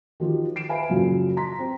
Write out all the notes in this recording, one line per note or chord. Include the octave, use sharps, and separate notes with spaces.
D#3 F3 F#4 G4
C7 D7 E7
B4 C5 E5 F5 G#5 B5
F#2 A#2 C#3 F3 F#3
A#5 C6 B6
C4 C5